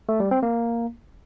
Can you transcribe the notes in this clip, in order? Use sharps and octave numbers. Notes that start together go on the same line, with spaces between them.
A3
G3
C4
A#3